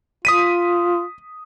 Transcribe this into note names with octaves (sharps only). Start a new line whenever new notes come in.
F4 D#6 B6 D#7